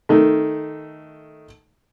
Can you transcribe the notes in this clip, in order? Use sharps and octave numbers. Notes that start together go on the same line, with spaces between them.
D#3 A3